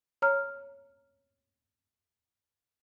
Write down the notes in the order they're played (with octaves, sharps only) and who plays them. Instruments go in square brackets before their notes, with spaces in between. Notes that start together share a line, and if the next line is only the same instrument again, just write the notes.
[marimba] C#5 A#5 F6